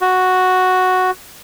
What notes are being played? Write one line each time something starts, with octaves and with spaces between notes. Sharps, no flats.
F#4